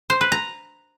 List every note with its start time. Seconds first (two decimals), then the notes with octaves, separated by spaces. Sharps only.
0.10 C5
0.21 B4
0.32 A#5